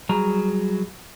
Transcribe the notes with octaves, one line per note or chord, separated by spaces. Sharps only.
F#3 G3 G#4 A#5